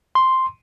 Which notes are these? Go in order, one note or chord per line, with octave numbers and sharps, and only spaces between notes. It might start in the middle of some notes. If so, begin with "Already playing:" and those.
C6